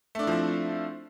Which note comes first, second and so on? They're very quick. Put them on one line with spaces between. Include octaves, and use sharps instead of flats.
A3 D4 E4 F3 C4